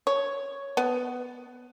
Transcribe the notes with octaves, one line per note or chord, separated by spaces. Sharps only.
C#5
B3